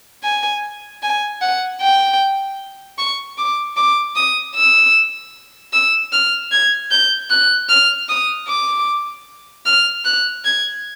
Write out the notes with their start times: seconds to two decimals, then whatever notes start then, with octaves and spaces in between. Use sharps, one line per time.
0.24 G#5
1.03 G#5
1.42 F#5
1.81 G5
2.98 C#6
3.38 D6
3.77 D6
4.16 D#6
4.56 E6
5.73 E6
6.13 F6
6.52 G#6
6.91 G6
7.30 F#6
7.69 F6
8.09 D#6
8.49 D6
9.66 F6
10.05 F#6
10.45 G#6